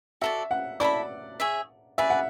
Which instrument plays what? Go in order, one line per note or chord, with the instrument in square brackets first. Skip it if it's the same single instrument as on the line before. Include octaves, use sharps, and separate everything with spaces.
[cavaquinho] F#4 A4 D5 [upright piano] E5
[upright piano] F#5
[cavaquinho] E4 A4 E5 B5 [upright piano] D5
[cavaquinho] G#4 C#5 E5
[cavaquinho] G#4 B4 D5 [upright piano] E5
[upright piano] F#5